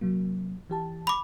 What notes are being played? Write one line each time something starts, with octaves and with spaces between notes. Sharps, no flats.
C3 F#3 A#3
E3 G4 A5
B5 D6